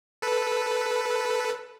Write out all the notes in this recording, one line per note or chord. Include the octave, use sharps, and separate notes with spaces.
A4 B4